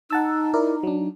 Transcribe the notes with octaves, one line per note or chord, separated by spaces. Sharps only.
D#4 F#5 A5 E6
E4 A#4 D5
F#3 D4